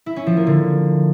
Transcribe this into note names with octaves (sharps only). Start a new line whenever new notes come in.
E4
C#4
F3
A#3
D3